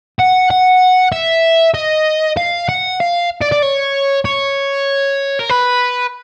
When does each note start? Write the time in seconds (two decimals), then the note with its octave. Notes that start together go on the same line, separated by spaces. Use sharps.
0.19 F#5
0.50 F#5
1.12 E5
1.74 D#5
2.37 F5
2.69 F#5
3.00 F5
3.41 D5
3.52 D5
3.62 C#5
4.25 C#5
5.39 A#4
5.49 B4